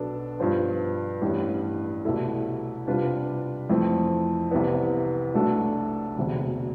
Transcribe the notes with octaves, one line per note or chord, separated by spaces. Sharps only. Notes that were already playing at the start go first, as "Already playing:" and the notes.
Already playing: B1 B2 B3 D4 A4
G2 F3 B3 F4 C5
A1 G2 E3 G3
C2 B2 A3 E4 A4
C3 G3 D4 F4 B4
F2 E3 A3 C4
C2 C3 E3 B3
B1 B2 A3 D4 A4
E1 D2 C3